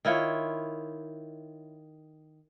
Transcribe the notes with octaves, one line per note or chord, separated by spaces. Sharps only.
D#3 E4 F4 C#5